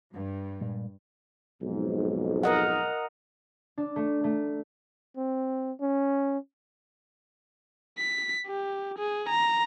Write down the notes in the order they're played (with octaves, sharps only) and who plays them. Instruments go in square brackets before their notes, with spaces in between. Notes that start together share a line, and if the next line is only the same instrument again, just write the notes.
[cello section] G2
[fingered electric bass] A#2 G3 G#3
[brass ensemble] B1 F2 G#2
[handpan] A#4 D#5 F#5
[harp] D4
A3
A3
[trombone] C4
C#4
[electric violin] B6
G4
G#4
A#5